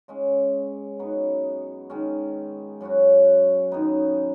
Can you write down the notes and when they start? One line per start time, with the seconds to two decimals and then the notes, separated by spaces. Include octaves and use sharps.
0.08 C#3 G#3 C#4
0.99 F#2 F#3 B3 D#4
1.90 D#3 G#3 C#4
2.81 F#2 F#3 C#4 F#4
3.72 F#2 D#3 B3 D#4